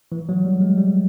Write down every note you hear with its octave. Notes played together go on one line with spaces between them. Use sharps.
E3
F#3
G3
G#3
G3